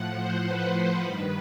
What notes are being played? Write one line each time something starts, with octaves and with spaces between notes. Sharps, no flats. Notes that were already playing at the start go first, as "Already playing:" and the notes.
Already playing: A2 F3 F#5
C5
B4
G2 D#3 B4